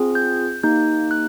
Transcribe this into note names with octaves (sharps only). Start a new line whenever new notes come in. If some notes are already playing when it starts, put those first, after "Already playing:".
Already playing: C4 F4 G#4
G6
A#3 D#4 G4 G6
F#6